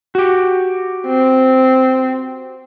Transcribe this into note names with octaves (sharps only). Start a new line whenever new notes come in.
F#4 G4
C4